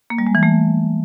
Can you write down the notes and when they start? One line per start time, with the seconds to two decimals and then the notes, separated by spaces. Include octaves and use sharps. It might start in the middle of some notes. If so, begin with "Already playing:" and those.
0.10 A#3
0.18 G3
0.27 G#3
0.35 E3
0.43 A3